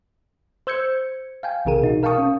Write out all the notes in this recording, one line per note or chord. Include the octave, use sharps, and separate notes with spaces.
C5 E6 G6 G#6 C#7
F5 G5 G#5
B1 C3 E3 G#4 A#4 D#7
B2 D#4 F#4
A#4 F5 G5 A5 C#6 D#6
C#4